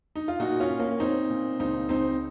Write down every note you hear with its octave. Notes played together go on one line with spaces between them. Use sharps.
D#4
F4
A#2 D#4 F#4
C#4 F4
A#2
A#3 C#4
A#2 C4 D#4
A#2
C#2 C4 D#4
C#2 C4 D#4